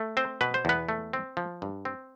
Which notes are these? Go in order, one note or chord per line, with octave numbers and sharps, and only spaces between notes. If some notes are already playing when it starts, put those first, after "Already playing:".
Already playing: A3
C4 C5
B2 B4
C5
E2 B3 B4
A3
C4
F3
G2
C4